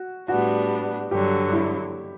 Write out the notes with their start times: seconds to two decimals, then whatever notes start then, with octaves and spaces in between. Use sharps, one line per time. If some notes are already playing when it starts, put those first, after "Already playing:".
Already playing: F#4
0.28 A2 G3 B3 D4 F#4
1.11 G2 D3 F#3 G4
1.52 E4